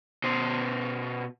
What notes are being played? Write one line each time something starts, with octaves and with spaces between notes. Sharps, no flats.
B2 C5